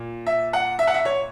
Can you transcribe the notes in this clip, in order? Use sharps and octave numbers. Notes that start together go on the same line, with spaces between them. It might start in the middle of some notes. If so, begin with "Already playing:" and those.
Already playing: A#2
E5
F#5
E5
F#5
E5
C#5